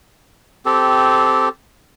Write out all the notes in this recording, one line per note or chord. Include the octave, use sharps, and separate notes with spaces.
C4 G4 A4